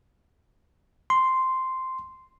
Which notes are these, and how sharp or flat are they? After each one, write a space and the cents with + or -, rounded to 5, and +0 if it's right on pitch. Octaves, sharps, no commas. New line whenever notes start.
C6 -5